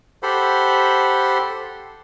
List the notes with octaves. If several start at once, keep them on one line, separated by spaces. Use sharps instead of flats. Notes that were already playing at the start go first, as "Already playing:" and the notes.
G4 A4 C5 F#5 B5 C6